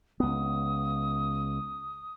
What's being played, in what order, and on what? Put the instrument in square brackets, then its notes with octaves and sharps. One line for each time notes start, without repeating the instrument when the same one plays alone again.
[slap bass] C#2 B3 [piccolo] D#6